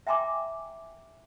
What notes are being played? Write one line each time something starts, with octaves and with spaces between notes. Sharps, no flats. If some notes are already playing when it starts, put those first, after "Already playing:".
E5 G5 G#5 A#5 C6 D6